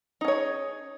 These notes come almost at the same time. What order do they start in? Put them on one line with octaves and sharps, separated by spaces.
D#4 C#4 C#5 G#4